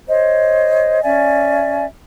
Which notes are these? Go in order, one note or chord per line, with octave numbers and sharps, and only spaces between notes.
C5 C#5 D#5
C#4 D5 E5 G#5